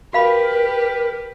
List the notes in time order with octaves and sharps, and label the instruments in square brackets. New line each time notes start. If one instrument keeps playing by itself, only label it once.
[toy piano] F#4 F5 B5 [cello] G4 B4 [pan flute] A#4